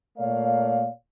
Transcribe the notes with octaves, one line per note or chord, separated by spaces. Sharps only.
A#2 A3 A#4 C#5 D5 F5